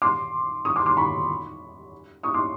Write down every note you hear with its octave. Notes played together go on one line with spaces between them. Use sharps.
C6 D6
C#6 D#6
C6 D6
C6 D6
B5 C#6
C#6 D#6
C6 D6